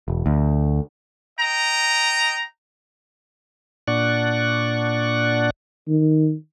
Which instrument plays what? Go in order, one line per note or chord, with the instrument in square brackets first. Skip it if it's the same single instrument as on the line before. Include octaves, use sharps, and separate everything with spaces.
[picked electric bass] E1
D2
[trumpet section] D#5 G5 A#5
[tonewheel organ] A#2 D4 D5 F#5 C#6
[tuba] D#3